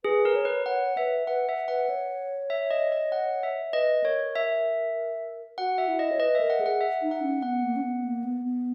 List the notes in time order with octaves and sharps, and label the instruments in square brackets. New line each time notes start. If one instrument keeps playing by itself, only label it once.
[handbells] G#4 [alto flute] B4
[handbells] A#4
[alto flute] C#5
[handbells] B4
[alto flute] C#5 [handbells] F#5
[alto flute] B4 [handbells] E5
[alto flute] B4 [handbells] F#5
[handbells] E5
[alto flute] B4 [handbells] F#5
[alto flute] C#5
[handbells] E5
D#5
D#5
F#5
E5
[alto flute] B4 [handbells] D#5
[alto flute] A#4 [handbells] C#5
[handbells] E5
[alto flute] F#4 [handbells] F#5
[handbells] E5
[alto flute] E4
[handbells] D#5
[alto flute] C#5
[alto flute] B4 [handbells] D#5
[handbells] E5
[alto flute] A#4
[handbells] F#5
[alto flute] G#4
[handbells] F#5
E5
[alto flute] D#4
[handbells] F#5
[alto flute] C#4
[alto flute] B3 [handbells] F#5
[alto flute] A#3
C#4
B3
A#3
B3
B3